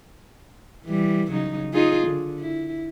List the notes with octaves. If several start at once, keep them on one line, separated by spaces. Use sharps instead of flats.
E3 G3
C#3 F#3 D#4
D#4 F4 G#4
D3
E4